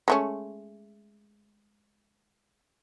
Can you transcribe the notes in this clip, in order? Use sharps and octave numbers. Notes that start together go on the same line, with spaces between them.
G#3 A3 C#4